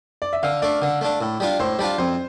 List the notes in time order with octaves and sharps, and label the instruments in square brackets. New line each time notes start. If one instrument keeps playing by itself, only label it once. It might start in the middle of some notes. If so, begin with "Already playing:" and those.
[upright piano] D5
E5
[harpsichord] D3 [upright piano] F5
[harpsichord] A3 D4 [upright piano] D5
[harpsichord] D3
A3 D4
A2
G3 D4 F4
[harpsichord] A2 [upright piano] C5
[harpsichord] G3 D4 F4 [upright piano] D5
[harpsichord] F2 [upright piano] C5